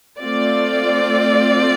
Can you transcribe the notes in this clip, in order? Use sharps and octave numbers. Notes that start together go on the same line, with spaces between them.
A3 C4 F4 D5